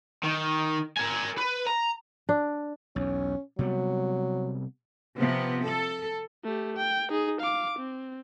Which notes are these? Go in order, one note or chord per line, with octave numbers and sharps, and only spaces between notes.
D#3
A#4 G#5
B4
A#5
D4
B1 E2 C#4
C3 F#3 G3 B3
C3 F3 B3
A4
A3 G4
G5
D#4 G#4
F5 D6
C4